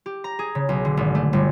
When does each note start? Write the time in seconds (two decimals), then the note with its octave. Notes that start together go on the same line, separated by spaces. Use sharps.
0.06 G4
0.24 A#5
0.39 G#4
0.55 C#3
0.69 B1
0.85 D3
0.97 G#1
1.15 A3
1.33 G1